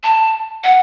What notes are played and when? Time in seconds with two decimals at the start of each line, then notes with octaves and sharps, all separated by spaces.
0.03 A5
0.64 F#5